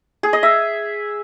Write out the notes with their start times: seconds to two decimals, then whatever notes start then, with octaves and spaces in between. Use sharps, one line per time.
0.23 G#4
0.33 D#5
0.43 E5